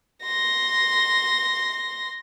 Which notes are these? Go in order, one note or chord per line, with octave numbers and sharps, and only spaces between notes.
C6 A#6